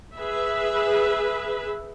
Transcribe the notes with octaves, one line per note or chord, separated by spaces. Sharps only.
G#4 B4 E5